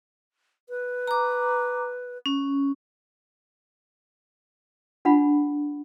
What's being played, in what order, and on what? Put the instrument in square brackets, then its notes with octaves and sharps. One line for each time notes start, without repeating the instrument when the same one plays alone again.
[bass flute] B4
[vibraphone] A#5 D6
C#4
[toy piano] D4 F4 F#5 B5